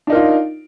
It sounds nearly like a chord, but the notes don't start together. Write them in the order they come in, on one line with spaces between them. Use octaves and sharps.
D4 D#4 A#4 F4